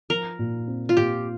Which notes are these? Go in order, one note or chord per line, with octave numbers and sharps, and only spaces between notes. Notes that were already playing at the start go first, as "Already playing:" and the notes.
F3 A#4
A#2
C4
F4
A#2 G4